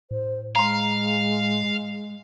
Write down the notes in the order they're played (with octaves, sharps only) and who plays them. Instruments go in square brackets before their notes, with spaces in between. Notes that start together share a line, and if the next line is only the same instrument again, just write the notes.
[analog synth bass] A2 [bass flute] C5
[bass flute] G#3 [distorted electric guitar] F5 [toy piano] A#5 C6